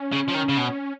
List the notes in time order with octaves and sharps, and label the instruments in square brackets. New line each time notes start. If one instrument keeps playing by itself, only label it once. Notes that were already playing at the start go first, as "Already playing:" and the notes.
Already playing: [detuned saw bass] C#4
[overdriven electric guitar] C#3
F3
D#3
C#3
B2